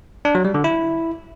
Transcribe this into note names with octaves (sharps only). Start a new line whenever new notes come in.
D4
F#3
G3
D3
E4